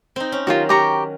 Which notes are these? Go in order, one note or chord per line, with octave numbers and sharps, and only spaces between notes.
C4 D#4
C#4
D#3 F#3 F4 F#4
G4 A#5 C#6